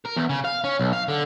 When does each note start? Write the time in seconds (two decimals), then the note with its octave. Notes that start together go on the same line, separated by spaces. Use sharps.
0.05 A#4
0.16 E2
0.29 C#3
0.45 F5
0.64 C#4
0.79 B1
0.93 F5
1.08 D3